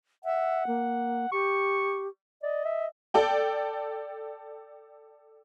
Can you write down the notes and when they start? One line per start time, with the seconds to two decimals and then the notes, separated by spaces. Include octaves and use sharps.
0.25 E5 F#5
0.67 A#3
1.32 G4 C#6
2.42 D5 D#5
2.65 E5
3.14 A4 D5 G5